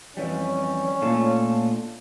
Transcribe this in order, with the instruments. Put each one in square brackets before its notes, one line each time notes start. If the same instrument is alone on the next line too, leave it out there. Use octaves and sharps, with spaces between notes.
[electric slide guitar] F2 E3 G3 [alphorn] C#4
[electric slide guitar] A#2 A3 D4 F4 A4